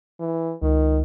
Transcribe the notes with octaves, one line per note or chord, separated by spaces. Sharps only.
E3
C#2 D#3